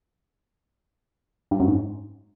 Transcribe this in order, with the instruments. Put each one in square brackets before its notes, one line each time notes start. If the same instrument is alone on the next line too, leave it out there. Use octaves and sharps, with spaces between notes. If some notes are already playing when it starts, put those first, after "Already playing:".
[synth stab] G2
F#2
G#2